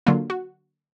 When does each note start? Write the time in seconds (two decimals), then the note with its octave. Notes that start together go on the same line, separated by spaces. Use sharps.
0.06 D3 F#3 A#3 F4
0.30 F#4